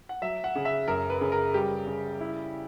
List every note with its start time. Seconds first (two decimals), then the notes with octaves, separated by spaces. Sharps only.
0.09 F#5
0.22 F#3 E5
0.44 F#5
0.55 C#3
0.65 E5
0.88 F#2 A#4
1.10 B4
1.21 C#3
1.32 A#4
1.54 G3 G4
1.87 C#3
2.20 E4